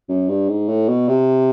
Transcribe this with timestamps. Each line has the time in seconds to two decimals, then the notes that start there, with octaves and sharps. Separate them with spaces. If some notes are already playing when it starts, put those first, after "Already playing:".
0.09 F#2
0.29 G2
0.49 G#2
0.69 A2
0.88 B2
1.09 C3